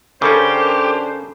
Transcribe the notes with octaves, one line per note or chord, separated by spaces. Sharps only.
C#3 G3 C#4 D4 G4 A4 A#4 C5